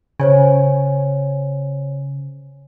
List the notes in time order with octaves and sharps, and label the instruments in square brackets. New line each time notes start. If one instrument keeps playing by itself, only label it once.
[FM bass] C#3 [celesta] C5 C#5 G#5